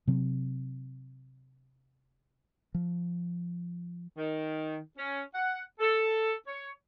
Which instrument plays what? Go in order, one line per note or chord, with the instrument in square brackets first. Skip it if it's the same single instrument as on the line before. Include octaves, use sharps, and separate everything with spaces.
[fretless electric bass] C3 F#3 C4
[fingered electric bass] F3
[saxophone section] D#3
C#4
F#5
A4
C#5